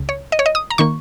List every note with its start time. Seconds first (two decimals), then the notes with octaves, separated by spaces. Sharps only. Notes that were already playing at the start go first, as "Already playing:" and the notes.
Already playing: C#2 C#3
0.09 C#5
0.32 D#5
0.39 C#5
0.46 D#5
0.55 D#6
0.70 A#5
0.78 D#3 A#3 C#6